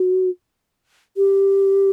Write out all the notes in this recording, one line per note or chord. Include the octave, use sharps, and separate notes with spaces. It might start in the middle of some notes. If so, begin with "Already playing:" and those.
Already playing: F#4
G4